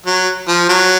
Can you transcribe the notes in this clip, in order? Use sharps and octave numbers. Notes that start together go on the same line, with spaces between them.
F#3
F3
F#3